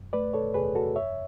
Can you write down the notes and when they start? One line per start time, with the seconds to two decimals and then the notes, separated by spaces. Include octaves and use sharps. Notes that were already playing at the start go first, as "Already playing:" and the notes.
Already playing: F#2
0.13 A3 B4 D5
0.34 A4 C#5
0.54 E2 G#4 B4
0.75 F#4 A4
0.96 F#2 C#5 E5